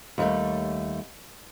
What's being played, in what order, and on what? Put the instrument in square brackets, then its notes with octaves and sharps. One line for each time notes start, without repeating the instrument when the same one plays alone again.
[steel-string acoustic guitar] D#2 G3 A3